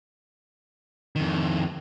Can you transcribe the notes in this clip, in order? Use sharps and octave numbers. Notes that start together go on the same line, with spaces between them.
F2 D#3